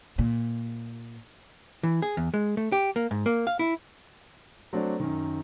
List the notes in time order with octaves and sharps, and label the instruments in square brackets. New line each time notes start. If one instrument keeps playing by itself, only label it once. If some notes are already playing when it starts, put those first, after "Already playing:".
[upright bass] A#2
[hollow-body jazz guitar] E3
G#4
E2
G#3
A3
G4
A#3
G#2
A#3
F5
E4
[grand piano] F#3 A3 C4 D4
F#2 D#3